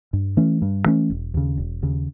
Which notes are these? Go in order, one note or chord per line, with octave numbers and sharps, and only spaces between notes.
G2
E3 A3 C#4
G2
E3 A3 C#4
E1
D#2 C#3
E1
D#2 C#3